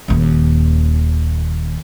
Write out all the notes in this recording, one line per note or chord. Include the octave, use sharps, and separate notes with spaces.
D#1 D#2